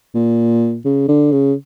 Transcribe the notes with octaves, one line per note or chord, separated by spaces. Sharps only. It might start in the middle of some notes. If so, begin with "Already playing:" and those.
A#2
C#3
D3
C#3